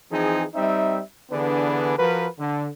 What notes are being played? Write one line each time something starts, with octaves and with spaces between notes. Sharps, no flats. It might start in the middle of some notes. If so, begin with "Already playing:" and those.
E3 F3 C4 D#4 G#4
G3 C4 D#4 E5
D3 E3 B3 D4 G#4 B4
F3 F#4 A#4 B4
D3